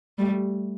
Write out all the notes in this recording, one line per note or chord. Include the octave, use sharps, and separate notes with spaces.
G3 A3